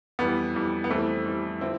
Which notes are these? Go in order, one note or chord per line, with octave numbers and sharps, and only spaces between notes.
F2 E3 G3 B3
F2 E3 G3
B3
F2 E3 G3 A3 C4
F2 E3 G3
D3 F3 C4 E4